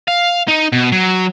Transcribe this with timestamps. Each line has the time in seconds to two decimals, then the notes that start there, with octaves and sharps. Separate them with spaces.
0.08 F5
0.48 D#4
0.72 B2
0.92 F#3